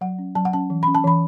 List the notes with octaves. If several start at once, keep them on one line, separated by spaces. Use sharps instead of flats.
F#3 F#5
C#4
F#3 A5
F#5
C#4 A5
E3
C#4 B5
A5
E3 B5